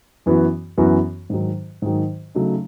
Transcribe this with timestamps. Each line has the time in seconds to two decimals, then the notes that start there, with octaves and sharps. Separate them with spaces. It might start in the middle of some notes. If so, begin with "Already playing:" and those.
0.26 F#2 E3 B3 F#4
0.78 F#2 E3 B3 F#4
1.30 G#2 D#3 F#3
1.82 G#2 D#3 F#3
2.35 C#3 F#3 A3 D#4